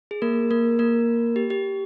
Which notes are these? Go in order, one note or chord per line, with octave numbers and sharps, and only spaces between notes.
G#4
A#3 A#4
A#3 A#4
A#3 A#4
G4
G4